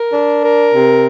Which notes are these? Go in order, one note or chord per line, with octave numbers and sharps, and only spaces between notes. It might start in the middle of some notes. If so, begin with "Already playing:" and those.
Already playing: A#4
D4
A#4
C3